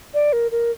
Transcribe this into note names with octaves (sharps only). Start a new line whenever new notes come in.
D5
A#4
A#4